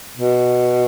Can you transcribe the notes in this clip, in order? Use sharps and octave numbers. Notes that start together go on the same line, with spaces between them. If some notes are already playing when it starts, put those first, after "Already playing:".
B2